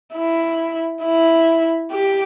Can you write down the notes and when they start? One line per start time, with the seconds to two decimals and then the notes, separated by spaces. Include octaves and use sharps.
0.15 E4
1.03 E4
1.91 G4